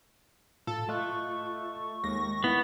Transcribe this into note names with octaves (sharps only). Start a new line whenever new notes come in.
A2 F4 A4
A3 F4 D#5 C#6 F#6
D#2 G#3 A#6
B3 E4